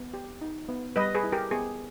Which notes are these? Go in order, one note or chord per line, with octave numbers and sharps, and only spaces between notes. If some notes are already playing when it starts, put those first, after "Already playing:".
Already playing: B3
G4
D#4
B3
G3 B4 D#5
G#4 B4
E4
G4 A#4
B3 G#4